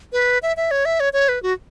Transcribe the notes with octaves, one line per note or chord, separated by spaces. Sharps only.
B4
E5
E5
C#5
E5
C#5
C#5
B4
F#4